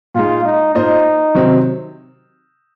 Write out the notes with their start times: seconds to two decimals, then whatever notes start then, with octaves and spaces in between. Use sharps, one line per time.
0.14 A#2 G#3 D#4 F4
0.45 D#4
0.75 A#3 D#4 F4 C5 D#5
1.35 C3 D#3 F#3 C4